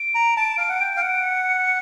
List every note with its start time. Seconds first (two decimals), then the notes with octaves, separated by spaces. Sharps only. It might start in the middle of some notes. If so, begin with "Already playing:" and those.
Already playing: D7
0.15 A#5
0.37 A5
0.58 F5
0.69 F#5
0.81 G5
0.96 F5
1.01 F#5
1.23 C#7